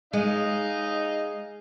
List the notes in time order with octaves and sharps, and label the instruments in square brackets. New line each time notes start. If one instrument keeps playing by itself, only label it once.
[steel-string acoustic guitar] G#3 [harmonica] D#4 D#5 F5